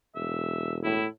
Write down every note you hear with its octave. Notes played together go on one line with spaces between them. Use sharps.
E1 E5
A2 E4